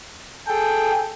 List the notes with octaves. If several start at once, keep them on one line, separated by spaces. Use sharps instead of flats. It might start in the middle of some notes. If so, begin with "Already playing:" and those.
G#4 A4 G5